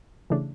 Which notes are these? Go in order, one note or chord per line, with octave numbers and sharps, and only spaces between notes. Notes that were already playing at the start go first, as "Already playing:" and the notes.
C#3 E3 A3 D4